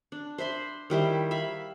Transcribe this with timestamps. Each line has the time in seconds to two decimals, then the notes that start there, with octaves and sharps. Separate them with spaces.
0.12 D4
0.38 C5 E5 B5 C6
0.90 D#3 G3 E4 C5
1.31 E5 F5 B5